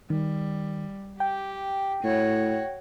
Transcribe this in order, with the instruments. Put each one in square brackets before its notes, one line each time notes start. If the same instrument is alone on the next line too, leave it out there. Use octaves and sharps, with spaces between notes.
[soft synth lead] D#3 [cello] G3
[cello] G4 [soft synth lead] G5
[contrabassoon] A2 [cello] F#4 C#5